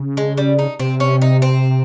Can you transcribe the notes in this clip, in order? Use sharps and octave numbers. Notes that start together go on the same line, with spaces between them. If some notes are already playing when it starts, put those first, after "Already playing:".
Already playing: C#3
G#3
G3
D#4
C3 C4
C#4
D#4
C4